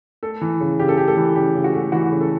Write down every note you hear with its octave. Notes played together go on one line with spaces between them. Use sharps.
A3 A4
E3
C#3
C#3 G4
A4
A3 G4
A4
E3
C#3 G4
C#3
F#4
A3
E3 F#4
C#3
A4